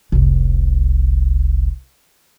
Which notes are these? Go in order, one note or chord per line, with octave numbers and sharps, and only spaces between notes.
F1 C2